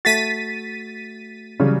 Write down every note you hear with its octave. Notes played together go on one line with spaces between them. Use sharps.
A3 F#4 A6 B6 D#7
C#3 E3 F#3 G3